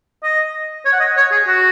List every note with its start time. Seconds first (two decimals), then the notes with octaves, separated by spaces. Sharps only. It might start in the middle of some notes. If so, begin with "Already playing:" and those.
0.23 D#5
0.85 C#5
0.93 F#5
1.00 D#5
1.17 C#5
1.32 G#4
1.47 F#4